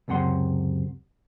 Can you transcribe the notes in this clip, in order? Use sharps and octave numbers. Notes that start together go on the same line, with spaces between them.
C#2 F#2 C3 F#5 C6